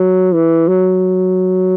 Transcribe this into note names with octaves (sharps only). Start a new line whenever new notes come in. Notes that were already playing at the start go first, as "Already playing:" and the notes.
Already playing: F#3
E3
F#3